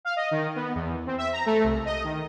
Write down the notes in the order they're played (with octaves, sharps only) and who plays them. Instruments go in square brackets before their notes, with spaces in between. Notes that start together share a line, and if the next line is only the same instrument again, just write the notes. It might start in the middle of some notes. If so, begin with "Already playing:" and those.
[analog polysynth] F5
D#5
D#3
B3
E2
C4
E5
A#5
A3
C2
D#5
D#3